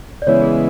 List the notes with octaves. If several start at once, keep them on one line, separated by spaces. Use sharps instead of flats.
D5
C#3 E3 G#3 B3 E4 C#5
G#4